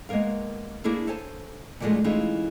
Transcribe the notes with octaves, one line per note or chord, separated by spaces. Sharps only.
G#3 A#3 B3 A#4 F5
A#3 D4 E4 G#4 A4
A4 C5 C#5 G#5 A5
A#2 D3 F3 F#3 G#3 A3
E3 G#3 A3 C#4 D#4 F4